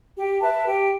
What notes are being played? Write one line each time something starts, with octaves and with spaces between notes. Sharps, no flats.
G4
B4 E5 A5
G4